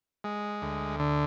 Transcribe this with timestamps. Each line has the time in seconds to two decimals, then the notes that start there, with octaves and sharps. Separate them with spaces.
0.24 G#3
0.62 D2
1.00 D3